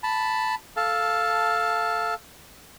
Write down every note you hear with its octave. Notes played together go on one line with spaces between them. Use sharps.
A5 B5
A4 F5 A5